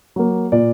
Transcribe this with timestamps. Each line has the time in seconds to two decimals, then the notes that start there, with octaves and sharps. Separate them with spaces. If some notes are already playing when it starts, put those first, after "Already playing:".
0.16 F#3 A#3
0.52 A#2 D5